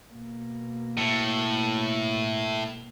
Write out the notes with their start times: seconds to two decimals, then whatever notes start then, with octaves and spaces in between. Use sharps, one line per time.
0.11 B2 A#3
0.97 A2